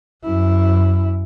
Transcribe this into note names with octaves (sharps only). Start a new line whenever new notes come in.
F#2 E4